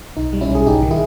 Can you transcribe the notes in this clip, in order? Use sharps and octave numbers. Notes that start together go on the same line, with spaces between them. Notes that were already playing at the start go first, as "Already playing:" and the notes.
B1 D#4
G3
C#4 E4
B1
G#4
G#1 D#4 G4
D#3
E4 G#4